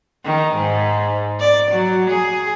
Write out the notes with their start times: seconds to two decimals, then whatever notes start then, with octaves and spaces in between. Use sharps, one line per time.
0.25 D#3
0.55 G#2
1.40 D5
1.71 F#3
2.10 G#4